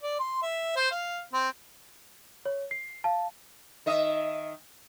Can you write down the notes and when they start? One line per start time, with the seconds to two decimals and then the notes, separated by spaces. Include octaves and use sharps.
0.03 D5
0.19 C6
0.42 E5
0.76 C5
0.91 F5
1.33 C4
2.45 C#5
2.71 C7
3.04 F5 A5
3.86 D#3 D#5 E5